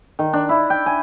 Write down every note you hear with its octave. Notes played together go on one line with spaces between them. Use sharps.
D#3
D4
E4
G5
G#5